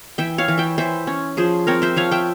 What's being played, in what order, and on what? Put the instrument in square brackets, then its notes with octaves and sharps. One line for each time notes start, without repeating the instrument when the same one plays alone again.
[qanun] E3 E5 G5
C#5 F5
E3
E5 G5
E3 C5 E5
C#4
F3 G#4 C5
C4 A#4 C#5
C5 E5
F3 C#5 F5
E5 G5